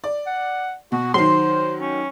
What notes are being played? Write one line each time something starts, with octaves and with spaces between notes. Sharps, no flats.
D5
F#5
B2 F#4
D#3 F#3 C5 C6
C#4